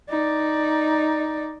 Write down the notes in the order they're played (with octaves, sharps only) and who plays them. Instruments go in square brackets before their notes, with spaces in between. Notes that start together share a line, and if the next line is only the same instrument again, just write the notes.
[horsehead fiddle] D#4 D5